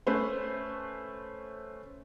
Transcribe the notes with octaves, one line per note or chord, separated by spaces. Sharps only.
A3 C#4 B4 C5